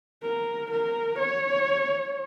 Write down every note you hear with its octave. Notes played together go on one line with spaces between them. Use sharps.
A#4
A#4
C#5